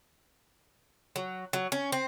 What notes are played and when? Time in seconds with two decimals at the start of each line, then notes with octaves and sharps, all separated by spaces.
1.16 F#3
1.53 F#3
1.72 C#4
1.92 C4